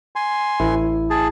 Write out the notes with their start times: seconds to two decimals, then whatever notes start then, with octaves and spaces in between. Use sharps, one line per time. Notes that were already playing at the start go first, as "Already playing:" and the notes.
0.16 G#5 C6
0.60 A1 E4
1.10 G#4 A5